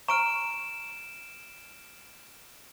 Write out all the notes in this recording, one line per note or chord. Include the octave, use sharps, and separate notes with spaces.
A#5 C#6 F6 D7 E7